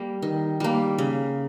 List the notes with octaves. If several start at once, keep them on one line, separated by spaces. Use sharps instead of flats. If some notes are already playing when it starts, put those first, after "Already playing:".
Already playing: G3 A#3 G5
D#3
G3 A#3
C#3